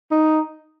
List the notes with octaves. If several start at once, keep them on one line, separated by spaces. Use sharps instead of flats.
D#4